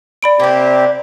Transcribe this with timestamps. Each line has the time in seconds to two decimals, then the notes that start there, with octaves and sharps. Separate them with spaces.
0.23 D5 B5 D7
0.40 C3 A#3 C4 D4 G4